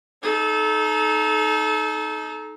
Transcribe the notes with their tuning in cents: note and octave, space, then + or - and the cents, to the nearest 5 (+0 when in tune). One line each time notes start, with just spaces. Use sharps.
D#4 +0 A4 -30